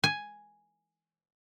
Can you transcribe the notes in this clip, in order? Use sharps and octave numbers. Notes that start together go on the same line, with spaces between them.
G#5